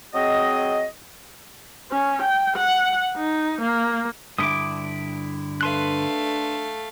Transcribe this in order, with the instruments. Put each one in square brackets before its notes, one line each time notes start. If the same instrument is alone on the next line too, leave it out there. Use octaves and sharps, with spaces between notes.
[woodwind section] F#3 C4 G#4 D#5
[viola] C#4
G5
F#5
D#4
A#3
[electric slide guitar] G2 D3 E4 [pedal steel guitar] D6 D#6
[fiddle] A3 F5 [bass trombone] D4 [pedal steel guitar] B4 C6 F#6